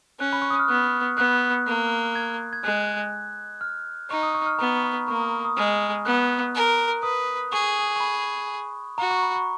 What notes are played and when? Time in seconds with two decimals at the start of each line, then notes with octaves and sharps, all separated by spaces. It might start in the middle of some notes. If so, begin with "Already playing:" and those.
0.19 C#4 F#6
0.33 B5
0.42 C#6
0.51 D#6
0.59 F6
0.68 B3 F#6
1.17 B3 F#6
1.67 A#3
2.15 G#6
2.53 G#6
2.64 G#3 F#6
3.61 F6
4.10 D#4 C#6
4.23 D#6
4.35 C#6
4.46 F6
4.59 B3 A#5
4.77 C#6
4.83 B5
5.07 A#3 C#6
5.20 D#6
5.45 D#6
5.57 G#3 F6
6.05 B3 F#6
6.55 A#4
7.03 B4 D#6
7.52 G#4 C#6
7.96 C#6
8.00 B5
8.98 F#4 A#5
9.11 C#6
9.23 B5
9.36 C#6